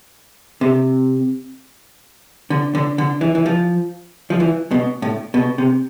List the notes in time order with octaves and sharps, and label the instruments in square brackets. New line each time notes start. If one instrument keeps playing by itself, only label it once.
[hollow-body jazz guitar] C3
D3
D3
D3
E3
E3
F3
F3
E3
B2
A2
B2
C3